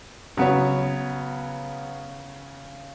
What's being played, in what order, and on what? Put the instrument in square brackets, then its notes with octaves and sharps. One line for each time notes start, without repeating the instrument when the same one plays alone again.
[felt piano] C#3 C#5 [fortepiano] F#3 B3